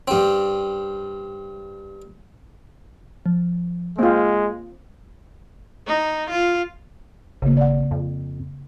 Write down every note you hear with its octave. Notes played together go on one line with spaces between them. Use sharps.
G2 C4
F3
G#3 A#3 C4 F4
D#4
F4
G#1 C#3 A#3
D5 F#5
F2